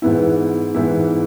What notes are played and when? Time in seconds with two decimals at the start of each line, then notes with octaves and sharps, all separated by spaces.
0.02 G#2 E3 B3 E4
0.74 G#2 E3 B3 E4